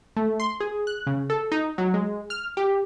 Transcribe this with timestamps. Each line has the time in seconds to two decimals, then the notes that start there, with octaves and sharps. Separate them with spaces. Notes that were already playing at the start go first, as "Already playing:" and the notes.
0.16 A3
0.40 C6
0.60 G#4
0.87 F#6
1.07 C#3
1.30 A4
1.52 D#4
1.78 F#3
1.94 G#3
2.30 F6
2.57 G4